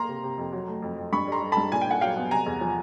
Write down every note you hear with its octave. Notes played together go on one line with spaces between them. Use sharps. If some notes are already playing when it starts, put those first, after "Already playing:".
Already playing: A#3 A#5 C6
C3
C3
F2
F#3
A3
F2
F2
G2 B5 C#6
G3 A#5 C6
G3
G2 A5 B5
A#2 G#5
G5
A#2 F#5 G#5
F#3 F5 G5
B3
C3 G#5 A#5
E2
F3